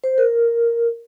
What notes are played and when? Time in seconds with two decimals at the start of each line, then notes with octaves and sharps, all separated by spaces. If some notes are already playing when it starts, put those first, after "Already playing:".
0.04 C5
0.18 A#4